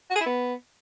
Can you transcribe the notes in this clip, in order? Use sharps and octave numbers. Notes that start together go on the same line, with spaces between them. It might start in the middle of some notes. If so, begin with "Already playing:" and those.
F#4
G#4
E4
B3